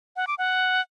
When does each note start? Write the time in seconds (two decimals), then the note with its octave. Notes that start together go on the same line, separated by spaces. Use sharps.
0.16 F#5
0.27 D6
0.38 F#5